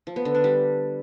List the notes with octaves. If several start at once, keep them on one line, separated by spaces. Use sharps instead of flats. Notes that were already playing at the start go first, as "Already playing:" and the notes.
F3
B3
D3
D4
G3